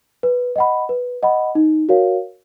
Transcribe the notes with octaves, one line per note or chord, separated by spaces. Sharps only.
B4
D#5 F#5 B5
B4
D#5 F#5 B5
D#4
F#4 A#4 C#5 F5